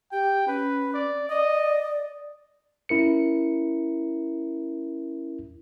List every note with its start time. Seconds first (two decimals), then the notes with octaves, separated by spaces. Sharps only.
0.12 G4 G5
0.48 C#4 B4
0.94 D5
1.29 D5 D#5
2.89 C#4 E4 A#4 C#7